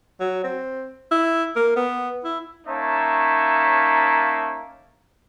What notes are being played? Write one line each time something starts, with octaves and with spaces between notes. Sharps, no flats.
F#3
C4
E4
A#3
B3
E4
A#3 C#4 D#4 C#5 E5 A5